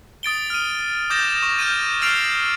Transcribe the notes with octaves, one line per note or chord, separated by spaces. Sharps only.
D#6 A6 D7 G7
F6 D#7
D6 D#6 G6 A6 A#6 E7
C#6
F6 G6 A6 D#7
E6 F6 A6 C7 D7 F7